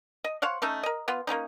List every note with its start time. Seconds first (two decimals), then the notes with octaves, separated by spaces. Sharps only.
0.24 D#5
0.42 C5 C#5 F5 F#5
0.62 A3 C#4 D#4 E5
0.83 A#4 D#5
1.08 B3 F4
1.27 A#3 B3 C#4 D#4